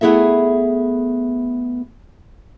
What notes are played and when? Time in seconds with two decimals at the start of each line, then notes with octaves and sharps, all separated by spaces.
0.01 A3 B3 E4 G#4 A4 E5